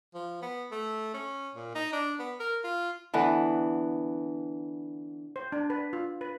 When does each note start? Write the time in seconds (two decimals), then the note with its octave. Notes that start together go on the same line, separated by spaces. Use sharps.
0.14 F3
0.42 B3
0.71 A3
1.14 C#4
1.55 A#2
1.75 D#4
1.93 D4
2.19 B3
2.39 A#4
2.64 F4
3.14 D3 E3 B3
5.36 C5
5.52 D4
5.70 B4
5.93 F4
6.21 B4